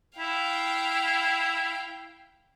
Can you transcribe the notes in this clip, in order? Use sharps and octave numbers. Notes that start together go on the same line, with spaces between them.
E4 F5 G5